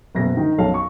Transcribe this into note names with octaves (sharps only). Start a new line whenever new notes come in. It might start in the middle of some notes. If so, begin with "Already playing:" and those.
F#1 B2 A4 A#6
D#3
B1 F#2 C#4 A4 F5
C#6